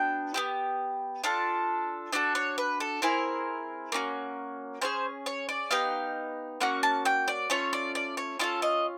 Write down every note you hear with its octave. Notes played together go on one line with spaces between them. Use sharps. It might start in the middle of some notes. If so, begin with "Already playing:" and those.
Already playing: B3 D4 F#4 G5
B3 E4 G4
D4 F4 A4
D4 F#4 A4 D5
C#5
B4
A4
C4 E4 G#4 A#4
A#3 C#4 F#4
C#4 F4 G#4 C5
C#5
D5
B3 D#4 G4 F5
A#3 C#4 F#4 F#5
A5
G5
D5
A3 C#4 F4 C#5
D5
D5
C#5
C#4 F4 A4 D#5
D#5